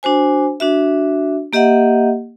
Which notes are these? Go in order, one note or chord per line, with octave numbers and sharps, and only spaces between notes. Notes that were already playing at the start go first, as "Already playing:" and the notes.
D4 F#4 C5 G#5
D4 F#4 E5
A#3 G4 D#5 E5 F#5